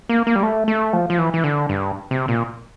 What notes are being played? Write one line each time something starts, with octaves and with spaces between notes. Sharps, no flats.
A#3
A#3
G3
A3
A3
F3
F3
E3
E3
D3
G2
C3
A#2